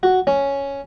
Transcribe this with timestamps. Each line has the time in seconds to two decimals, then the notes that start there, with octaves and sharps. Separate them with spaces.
0.03 F#4
0.27 C#4